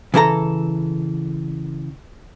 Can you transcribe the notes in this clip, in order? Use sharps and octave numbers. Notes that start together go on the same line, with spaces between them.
C#3 E3 A4 A#5